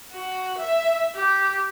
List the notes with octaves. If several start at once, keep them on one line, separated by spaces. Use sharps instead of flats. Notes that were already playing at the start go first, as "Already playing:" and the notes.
F#4
E5
G4